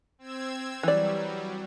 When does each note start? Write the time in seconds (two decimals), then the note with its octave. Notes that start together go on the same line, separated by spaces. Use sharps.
0.19 C4 E6 G#6
0.83 E3 F#3 G3 D5